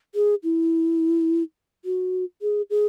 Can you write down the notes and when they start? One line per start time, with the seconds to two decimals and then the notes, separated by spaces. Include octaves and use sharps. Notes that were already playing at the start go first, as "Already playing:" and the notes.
0.15 G#4
0.44 E4
1.85 F#4
2.42 G#4
2.70 G#4